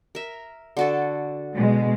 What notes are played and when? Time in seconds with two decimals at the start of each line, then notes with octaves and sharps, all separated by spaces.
0.15 A#4 E5
0.77 D3 F#4 A4
1.54 B2 G#3